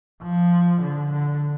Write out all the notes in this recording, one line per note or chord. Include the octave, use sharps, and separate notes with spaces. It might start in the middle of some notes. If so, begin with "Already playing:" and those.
F3
D3
D3